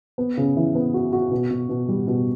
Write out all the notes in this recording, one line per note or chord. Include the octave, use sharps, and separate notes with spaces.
B3
C#3
E3
B3
F#4
F#4
B2
B2
B2
G3
B2